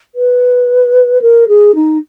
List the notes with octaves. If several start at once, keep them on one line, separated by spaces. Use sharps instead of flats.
B4
A#4
G#4
D#4